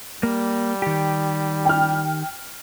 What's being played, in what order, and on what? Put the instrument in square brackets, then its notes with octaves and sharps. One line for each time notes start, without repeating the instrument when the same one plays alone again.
[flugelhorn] G3 [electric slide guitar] A#3
[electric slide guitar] D#3 G4
[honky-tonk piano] G5 F6